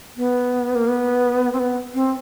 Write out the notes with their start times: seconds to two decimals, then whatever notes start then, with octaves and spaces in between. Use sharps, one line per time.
0.16 B3
0.75 A#3
0.88 B3
1.53 C4
1.59 B3
1.94 C4